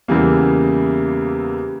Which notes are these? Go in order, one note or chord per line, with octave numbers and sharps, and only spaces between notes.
E2 C#3 E3 G3 A#3